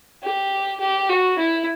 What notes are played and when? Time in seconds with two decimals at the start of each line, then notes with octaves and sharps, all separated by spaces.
0.23 G4
0.80 G4
1.09 F#4
1.39 E4